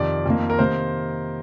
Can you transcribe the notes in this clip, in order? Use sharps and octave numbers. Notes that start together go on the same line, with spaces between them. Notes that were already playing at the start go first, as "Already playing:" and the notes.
Already playing: F2 C3 D#3 D5
F2 D#3 A#3
A#4
C3 D#3 A#3 C5